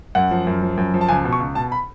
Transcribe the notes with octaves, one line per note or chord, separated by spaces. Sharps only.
F#2 F#5
F3
F#2
F3
F#2
F3
A5
C#2 G#5
B2
C#6
C#2
B2 A5
B5